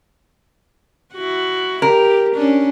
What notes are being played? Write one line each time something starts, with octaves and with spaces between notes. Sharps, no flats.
E4 F#4
G4 A#4
C#4 D4